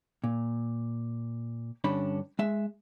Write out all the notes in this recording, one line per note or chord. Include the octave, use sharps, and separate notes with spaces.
A#2
G2 D3 C#4 D4 B5
G#3 E5